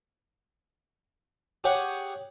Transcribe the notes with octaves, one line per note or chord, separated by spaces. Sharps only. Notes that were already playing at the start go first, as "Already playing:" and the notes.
G4 G#4 C#5 F#5